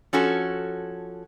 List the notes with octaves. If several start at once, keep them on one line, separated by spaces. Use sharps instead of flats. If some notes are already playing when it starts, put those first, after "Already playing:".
F3 C#4 F#4 A4